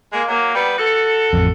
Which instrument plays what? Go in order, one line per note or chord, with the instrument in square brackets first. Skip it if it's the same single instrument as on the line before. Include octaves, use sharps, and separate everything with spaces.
[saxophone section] G#3 A#3
F#3 A#3
G3 B3 B4
F#4 A4
[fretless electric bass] A1 F2